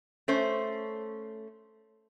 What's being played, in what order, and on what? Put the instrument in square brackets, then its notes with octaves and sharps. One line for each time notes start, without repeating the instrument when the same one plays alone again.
[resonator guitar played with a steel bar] A3 C#4 C5